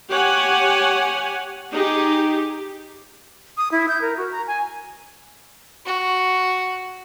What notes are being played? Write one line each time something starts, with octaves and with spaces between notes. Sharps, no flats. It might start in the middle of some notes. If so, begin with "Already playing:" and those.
G4 C#5 F#5 G#5
D#4 G4 G#4
D#6
E4
G6
A#4
F#4
A#5
G#5
F#4